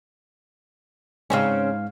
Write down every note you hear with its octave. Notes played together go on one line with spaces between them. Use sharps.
G#2 C#3 C4 C#4 F5